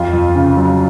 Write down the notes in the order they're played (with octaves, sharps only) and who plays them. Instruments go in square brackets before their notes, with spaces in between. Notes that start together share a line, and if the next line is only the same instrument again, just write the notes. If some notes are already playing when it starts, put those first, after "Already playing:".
Already playing: [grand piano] F2 F4
F2
C#3
F#3